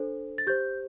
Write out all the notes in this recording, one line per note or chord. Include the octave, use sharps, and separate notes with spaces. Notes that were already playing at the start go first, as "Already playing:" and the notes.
Already playing: D4 A4 C5
A6
G4 C5 G6